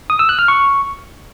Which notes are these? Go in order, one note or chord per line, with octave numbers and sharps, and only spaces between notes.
D#6
E6
F#6
F6
C#6